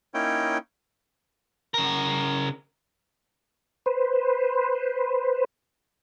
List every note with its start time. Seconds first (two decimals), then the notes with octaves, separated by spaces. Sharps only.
0.14 A#3 C#4 D#4 E4 C#5 G5
1.74 C#3 A#4
3.86 B4 C5